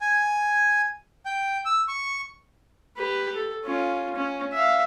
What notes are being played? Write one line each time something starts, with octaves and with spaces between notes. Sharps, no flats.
G#5
G5
E6
C#6
G4 B4
A4
C#4 F4
C#4
E5 F5